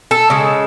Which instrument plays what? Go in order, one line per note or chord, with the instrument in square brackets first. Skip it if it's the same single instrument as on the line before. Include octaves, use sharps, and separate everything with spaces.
[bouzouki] A4
C#3 G#3